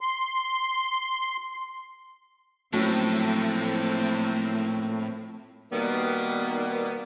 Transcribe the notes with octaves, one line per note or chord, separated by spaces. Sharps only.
C6
A2 F3 F#3 A3 A#3 C4 C#4
B2 D#3 G3 A#3 B3